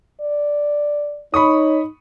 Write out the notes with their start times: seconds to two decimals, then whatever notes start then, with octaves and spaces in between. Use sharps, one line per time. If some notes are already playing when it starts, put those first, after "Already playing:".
0.21 D5
1.34 D#4 C#5 B5 C#6 D#6